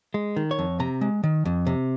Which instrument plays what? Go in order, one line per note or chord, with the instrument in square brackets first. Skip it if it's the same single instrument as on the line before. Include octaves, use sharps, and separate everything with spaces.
[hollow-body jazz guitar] G#3
D#3
C#5
F2
C3 A#5
G#3
D#3
F2
C3